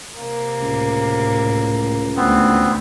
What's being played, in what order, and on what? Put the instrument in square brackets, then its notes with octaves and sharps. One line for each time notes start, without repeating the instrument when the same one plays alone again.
[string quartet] C3 A#3
[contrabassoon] C#2 [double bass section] A2
[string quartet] D2 E3 [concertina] B3 C4